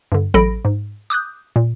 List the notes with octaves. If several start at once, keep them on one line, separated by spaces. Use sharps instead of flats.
G2 D3
A1 F#3 A4 B5 A#6 D7
G#2
D6 D#6 F#6 G6
A#2